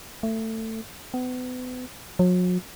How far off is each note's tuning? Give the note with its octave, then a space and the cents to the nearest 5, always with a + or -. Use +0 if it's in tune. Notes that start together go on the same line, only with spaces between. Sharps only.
A3 +20
B3 +35
F#3 -40